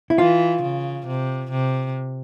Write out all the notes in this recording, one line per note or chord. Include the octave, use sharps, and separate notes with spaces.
E4
E3 F4
C#3
C3
C3